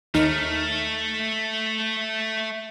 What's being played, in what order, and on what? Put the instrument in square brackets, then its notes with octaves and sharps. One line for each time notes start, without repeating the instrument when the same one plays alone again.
[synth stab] D#2 D#4 F6 [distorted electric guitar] A3